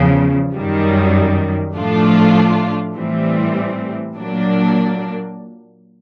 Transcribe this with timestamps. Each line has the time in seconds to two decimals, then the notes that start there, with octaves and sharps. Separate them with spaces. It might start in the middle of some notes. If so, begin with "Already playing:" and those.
Already playing: E2 C#3 F3
0.55 F#2 D#3 G3
1.76 A2 F3 A3 D4 F4
2.95 A2 E3 G3 C4
4.15 A#2 F#3 A#3 D4